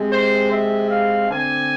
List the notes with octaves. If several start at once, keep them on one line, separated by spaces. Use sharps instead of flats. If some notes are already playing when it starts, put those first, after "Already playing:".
Already playing: C3 G#3 C4
C5
E5
F5
D3 A3 C4 G#5